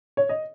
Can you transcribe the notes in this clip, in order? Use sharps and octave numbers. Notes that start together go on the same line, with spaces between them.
C#5
D#5